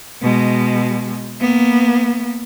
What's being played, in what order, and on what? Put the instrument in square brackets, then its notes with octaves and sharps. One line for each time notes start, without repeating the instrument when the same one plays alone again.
[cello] B2 G#3
A#3 B3